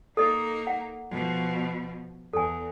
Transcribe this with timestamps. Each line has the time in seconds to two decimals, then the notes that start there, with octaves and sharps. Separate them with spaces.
0.17 A#3 D#4 A4 D#5
0.67 F#5
1.11 B2 F3
2.33 E2 A4 G#5